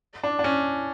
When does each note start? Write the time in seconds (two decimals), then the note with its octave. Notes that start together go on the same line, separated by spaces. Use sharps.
0.24 D4
0.39 D4
0.44 C#4